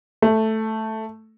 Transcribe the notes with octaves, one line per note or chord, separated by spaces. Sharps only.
A3